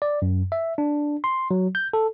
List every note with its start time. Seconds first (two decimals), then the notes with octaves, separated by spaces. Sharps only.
0.02 D5
0.22 F#2
0.52 E5
0.78 D4
1.24 C6
1.51 F#3
1.75 G6
1.93 A4